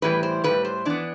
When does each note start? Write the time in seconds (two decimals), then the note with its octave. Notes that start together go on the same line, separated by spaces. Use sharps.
0.02 A2 E3 G3 B4
0.23 C5
0.44 A2 E3 G3 B4
0.65 C5
0.85 E3 B3 D4